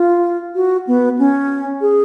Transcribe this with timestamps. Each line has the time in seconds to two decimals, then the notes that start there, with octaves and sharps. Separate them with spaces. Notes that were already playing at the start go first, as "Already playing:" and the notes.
Already playing: F4
0.55 F#4
0.87 B3
1.19 C#4
1.81 G#4